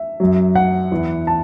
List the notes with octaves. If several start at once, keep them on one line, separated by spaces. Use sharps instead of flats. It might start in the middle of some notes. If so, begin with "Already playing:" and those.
Already playing: E5
F#2 F#3
F#5
E2 E3
A5